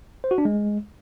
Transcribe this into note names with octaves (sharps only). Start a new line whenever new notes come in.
C5
F#4
D4
G#3